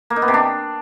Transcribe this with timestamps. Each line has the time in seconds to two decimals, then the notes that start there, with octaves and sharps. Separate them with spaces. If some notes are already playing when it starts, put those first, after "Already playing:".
0.10 A#3
0.16 D#4
0.22 B3
0.28 C3
0.34 D4